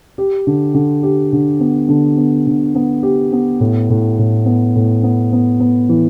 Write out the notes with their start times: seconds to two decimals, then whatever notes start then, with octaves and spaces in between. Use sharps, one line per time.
0.18 G4
0.47 D3
0.74 D3
1.03 G4
1.33 D3
1.60 B3
1.89 D3
2.17 B3
2.47 D3
2.75 B3
3.03 G4
3.32 B3
3.60 A2
3.90 A2
4.18 A2
4.46 B3
4.75 A2
5.03 B3
5.32 B3
5.60 B3
5.89 E3